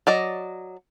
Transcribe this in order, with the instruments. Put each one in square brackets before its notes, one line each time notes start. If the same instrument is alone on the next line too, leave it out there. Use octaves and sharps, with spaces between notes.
[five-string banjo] F#3 D5 D#5